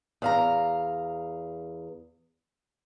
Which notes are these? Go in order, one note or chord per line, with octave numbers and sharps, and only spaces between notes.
E2 F5 A#5